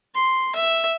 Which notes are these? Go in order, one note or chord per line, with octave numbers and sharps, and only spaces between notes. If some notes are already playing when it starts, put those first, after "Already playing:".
C6
E5